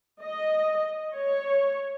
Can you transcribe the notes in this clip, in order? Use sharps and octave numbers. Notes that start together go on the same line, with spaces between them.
D#5
C#5